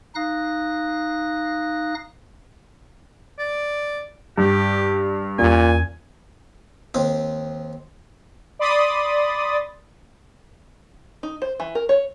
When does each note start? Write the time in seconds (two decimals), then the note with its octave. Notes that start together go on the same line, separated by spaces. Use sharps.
0.15 D#4 F5 D#6 F#6 A#6
3.39 D5
4.38 G2 G4
5.39 E2 A#2 C#4 G#5
6.94 D#2 C4
8.59 D5 B5 C6 D#6 A6
11.23 D#4
11.42 C5
11.60 E3
11.75 A#4
11.89 C#5